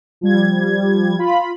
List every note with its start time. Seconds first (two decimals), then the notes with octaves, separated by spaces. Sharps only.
0.21 F3 G3 G#6
1.19 F4 B5